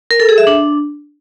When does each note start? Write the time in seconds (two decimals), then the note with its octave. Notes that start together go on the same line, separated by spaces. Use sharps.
0.11 A#4
0.20 A4
0.29 G#4
0.38 E5
0.47 D4